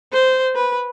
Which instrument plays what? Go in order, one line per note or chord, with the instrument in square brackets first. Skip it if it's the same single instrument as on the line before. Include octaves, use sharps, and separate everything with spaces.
[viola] C5
B4